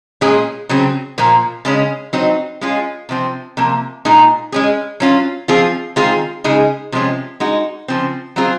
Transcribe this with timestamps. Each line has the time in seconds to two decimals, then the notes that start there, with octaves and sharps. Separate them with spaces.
0.21 A#2 G#3 C#4 G#4
0.69 C#3 F#3 C4
1.18 A#2 F3 A#3
1.65 C#3 G#3 C#4
2.13 F#3 C4 D#4
2.61 G#3 C#4 F4 G#4
3.09 C3 F3 C4
3.57 C3 F3 A#3
4.05 A#2 G#3 D#4 G#4
4.52 G#3 C#4 G#4
5.00 F#3 C#4 F4
5.48 F3 C4 F4 G#4
5.96 D#3 G#3 C4 F4 G#4
6.44 C#3 G#3 D#4 G#4
6.92 C3 F3 G#3 C#4
7.40 G#3 D#4 F#4
7.88 C#3 F3 C4
8.36 F#3 C4 F4 G#4